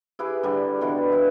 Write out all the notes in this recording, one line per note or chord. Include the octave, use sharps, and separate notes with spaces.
E4 G4 G#4 B4
D3 G3 G5
B2 D3 E3
E4 B4